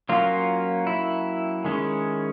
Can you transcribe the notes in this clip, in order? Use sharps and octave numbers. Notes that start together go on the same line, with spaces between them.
F#3 A#3 C#4 F4
E4
D#3 G#3 C#4